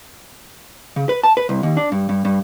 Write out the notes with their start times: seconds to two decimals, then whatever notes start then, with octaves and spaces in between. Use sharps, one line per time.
0.96 C#3
1.09 B4
1.23 A5
1.37 B4
1.49 C2
1.63 D#2
1.77 D4
1.92 G2
2.09 G2
2.25 G2